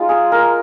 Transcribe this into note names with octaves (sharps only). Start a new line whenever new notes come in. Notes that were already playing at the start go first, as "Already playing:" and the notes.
Already playing: G#3 D#4 F4
G#4
A#4